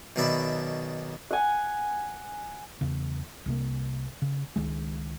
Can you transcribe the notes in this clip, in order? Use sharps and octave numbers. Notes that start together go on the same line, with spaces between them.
B1 B2 D#3 D5 E5 B5
F#5 G#5
E2 C#3
C2 C3 A#3
C#3
C#2 D#3 G#3